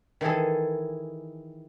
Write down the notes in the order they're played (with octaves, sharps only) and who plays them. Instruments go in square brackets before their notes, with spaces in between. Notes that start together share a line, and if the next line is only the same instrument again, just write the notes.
[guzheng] D#3 E3 G#4 A4